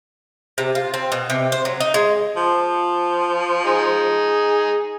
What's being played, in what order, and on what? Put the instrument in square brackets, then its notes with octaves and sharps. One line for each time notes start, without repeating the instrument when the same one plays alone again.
[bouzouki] C3
F4
C4
B2
C3
C5
F#3
D#4
G#3
[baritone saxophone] F3
[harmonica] D#4 G#4